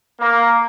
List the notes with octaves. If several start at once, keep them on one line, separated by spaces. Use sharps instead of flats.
A#3